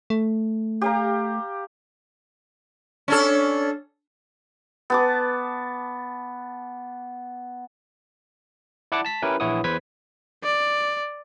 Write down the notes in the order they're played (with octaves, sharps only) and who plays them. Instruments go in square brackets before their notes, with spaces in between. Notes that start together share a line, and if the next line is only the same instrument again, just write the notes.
[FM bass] A3
[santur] G4 F5 A#5
[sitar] C#4 D4 A4
[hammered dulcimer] B3 A5 D6
[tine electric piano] E4 D5 F#5 A5 D6
A5 B6
C#4 E4 G4 A#4 B4
A#1 E3 E4 C#5 F#5 D#6
E2 B4 C5 G#6 B6
[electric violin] D5